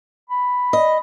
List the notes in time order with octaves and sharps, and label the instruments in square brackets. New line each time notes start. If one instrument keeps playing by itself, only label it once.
[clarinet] B5
[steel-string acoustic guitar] D#5